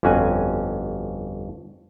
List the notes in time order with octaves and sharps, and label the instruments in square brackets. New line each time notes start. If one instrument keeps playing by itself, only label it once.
[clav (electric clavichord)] G1 F2 C#4 F#4 G#5